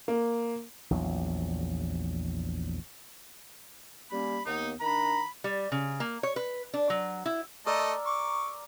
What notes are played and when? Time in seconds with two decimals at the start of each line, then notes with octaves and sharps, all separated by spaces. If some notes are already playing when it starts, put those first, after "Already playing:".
0.08 A#3
0.91 A#1 E2 F#3
4.11 G3 A#3 C#4 B5
4.45 D#2 A#3 B3 D#4
4.80 D#3 D4 A#5 B5
5.44 G3
5.72 C#3
6.00 A#3
6.23 C#5
6.36 B4
6.74 D4
6.90 F#3
7.26 E4
7.66 A3 A4 A#4 D5 D#5 E6
8.06 C#6 D6